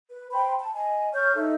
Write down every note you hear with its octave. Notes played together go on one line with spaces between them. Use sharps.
B4
C5 G5 B5 C6
A5
D#5 G#5
C#5 C#6 F6 G6
D#4 A4 E5